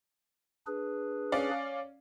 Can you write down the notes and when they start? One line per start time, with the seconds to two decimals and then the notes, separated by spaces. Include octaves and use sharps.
0.67 D4 G#4 B4
1.32 C#4 D5 F5